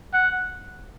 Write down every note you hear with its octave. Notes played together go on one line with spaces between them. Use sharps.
F#5